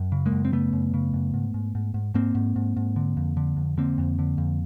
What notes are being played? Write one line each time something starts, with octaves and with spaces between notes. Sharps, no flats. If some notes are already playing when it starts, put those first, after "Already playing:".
Already playing: F#2
C#3
G#3 A#3
F#2
C4
C#3 A3 B3
F#2
C#3
F#2
G#2
G#2
G#2
G#2
G#2 A#3 C4
G#2
G#2
G#2
D3
F2
D3
F2
D3 A#3 C4
F2
D3
F2